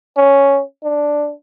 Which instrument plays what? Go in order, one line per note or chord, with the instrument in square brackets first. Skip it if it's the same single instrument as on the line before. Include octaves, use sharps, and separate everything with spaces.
[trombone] C#4
D4